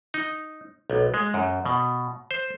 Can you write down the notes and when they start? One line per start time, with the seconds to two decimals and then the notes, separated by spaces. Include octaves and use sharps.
0.14 D#4
0.90 B1
1.14 G#3
1.34 F#2
1.65 B2
2.31 C5